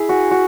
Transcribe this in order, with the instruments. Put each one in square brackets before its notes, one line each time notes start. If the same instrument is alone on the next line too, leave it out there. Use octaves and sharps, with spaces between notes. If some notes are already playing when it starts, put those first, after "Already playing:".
Already playing: [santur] E4 G#4 E5
F#4
F#4